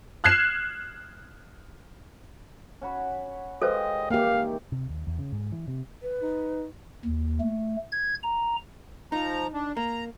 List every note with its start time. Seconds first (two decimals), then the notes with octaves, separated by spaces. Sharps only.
0.24 F6 F#6 G#6 C7 E7
2.81 C#4 F#4 B5
3.62 G#3 F4 G4 A4 B4 C5 D#5
4.11 D#3 E3 A#3 G4 F5
4.72 C3
4.89 D#2
5.07 E2
5.19 C#3
5.32 G#2
5.52 E3
5.68 C3
6.03 B4
6.22 D#4
7.05 D#2
7.40 A3
7.92 G#6
8.23 A#5
9.12 F3 D#4 A#5
9.54 D4
9.77 A#3 A#5